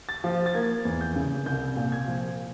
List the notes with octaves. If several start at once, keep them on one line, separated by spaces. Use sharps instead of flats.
A6
F3
A6
A#3 G#6
E2
G6
C#3
C2 G6
A#2
G#6
F3